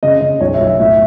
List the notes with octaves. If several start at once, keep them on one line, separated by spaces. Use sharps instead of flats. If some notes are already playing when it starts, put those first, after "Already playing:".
C#3 D#5
C#3 D#5
B1 C#5
E5
B1
E5
A2 E5